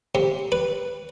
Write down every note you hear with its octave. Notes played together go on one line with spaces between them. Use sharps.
C3
B4